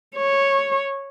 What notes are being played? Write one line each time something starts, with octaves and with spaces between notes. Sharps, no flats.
C#5